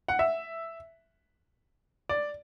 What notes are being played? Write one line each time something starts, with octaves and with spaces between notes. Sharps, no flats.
F#5
E5
D5